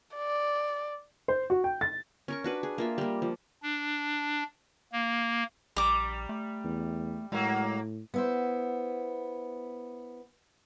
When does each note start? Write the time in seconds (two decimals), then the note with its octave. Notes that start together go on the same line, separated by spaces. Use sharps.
0.15 D5
1.28 C5
1.50 F#4
1.64 G5
1.81 A6
2.28 C#4 A#4 C#6
2.44 D4 F#4 B4
2.63 G#4
2.78 A#3 F4 E5
2.98 G3 A#3
3.22 F3
3.63 D4
4.92 A#3
5.76 A#1 G3 A#5 D6
6.29 A3
6.65 E2
7.32 A2 F#3 G#3 A#3
8.14 B3 E4 C5